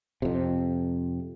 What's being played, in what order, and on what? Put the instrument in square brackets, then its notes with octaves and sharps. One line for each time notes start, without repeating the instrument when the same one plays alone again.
[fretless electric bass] F2 C3